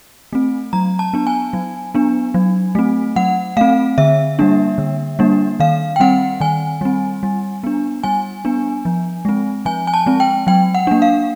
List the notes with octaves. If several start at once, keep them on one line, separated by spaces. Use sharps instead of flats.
A3 C4
F#3 A#5
A5
B3 D4
G#5
F#3
B3 D4
F#3
A3 C4
F#3 F#5
A3 C4 F5
D3 E5
G3 A#3 D4
D3
G3 A#3 D4
D#3 F5
G5
G3 C4 F#5
D#3 G#5
G3 C4
G3
B3 D4
G3 G#5
B3 D4
F3
G#3 C4
F3 G#5
G#5
A5
G#3 C4
G5
F#3 G5
F#5
A#3 D4
F5